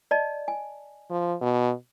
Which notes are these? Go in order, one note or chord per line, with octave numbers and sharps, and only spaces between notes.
D5 D#5 A5
G#5
F3
B2